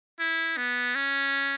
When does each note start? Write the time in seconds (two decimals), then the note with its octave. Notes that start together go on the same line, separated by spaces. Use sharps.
0.19 E4
0.57 B3
0.95 C#4